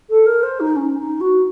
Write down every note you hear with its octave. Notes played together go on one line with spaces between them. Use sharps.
A4
A#4
C5
D#4
C#4
D#4
F#4